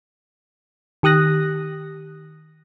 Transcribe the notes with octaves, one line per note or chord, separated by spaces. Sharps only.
D#3 G4 D#6 F#6 A#6